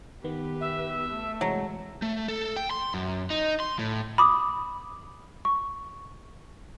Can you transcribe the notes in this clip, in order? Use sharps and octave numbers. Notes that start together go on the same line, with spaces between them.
D#3 B3 G4 B4
E5
A3
C3 E3 F#3 G#3
A3
A4
G5
C6
F#2
D#4
C6
A2
B5 D6 D#6
C#6